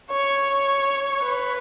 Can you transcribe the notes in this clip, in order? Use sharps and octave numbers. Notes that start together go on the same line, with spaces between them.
C#5
B4